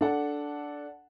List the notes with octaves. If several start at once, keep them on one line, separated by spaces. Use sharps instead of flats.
D4 A4 F#5